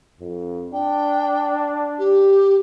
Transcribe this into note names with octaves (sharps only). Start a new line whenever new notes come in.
F2
D4 G5
G4